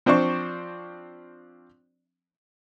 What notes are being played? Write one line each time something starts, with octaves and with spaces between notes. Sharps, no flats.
F3 C4 D4 C5 D5 C#6